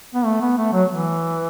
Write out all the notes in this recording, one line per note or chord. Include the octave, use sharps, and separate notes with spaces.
B3
A3
B3
A3
F#3
E3